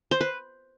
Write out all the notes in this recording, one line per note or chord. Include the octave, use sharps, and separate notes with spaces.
C5
B4